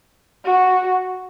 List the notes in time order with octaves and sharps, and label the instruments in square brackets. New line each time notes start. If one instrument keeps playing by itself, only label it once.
[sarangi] F#4